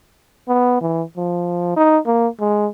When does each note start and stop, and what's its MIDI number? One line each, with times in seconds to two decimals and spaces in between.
0.48 0.81 59
0.81 1.03 52
1.17 1.72 53
1.76 1.98 63
2.06 2.28 58
2.40 2.68 56